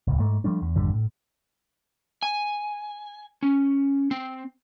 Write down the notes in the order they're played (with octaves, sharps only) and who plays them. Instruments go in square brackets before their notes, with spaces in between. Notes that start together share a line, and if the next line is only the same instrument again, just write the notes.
[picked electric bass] D1 C#2
G#2 A3
F3 G3 A3 D4
E2
G#1 F2 D3 G3
A2
[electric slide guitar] G#5
C#4
C4